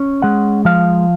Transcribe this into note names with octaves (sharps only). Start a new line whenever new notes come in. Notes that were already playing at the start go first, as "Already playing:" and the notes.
Already playing: C#4
G#3 F#5
F3 F5